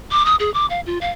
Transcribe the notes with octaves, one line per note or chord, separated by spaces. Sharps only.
D6
D#6
G#4
D6
F5
F4
F5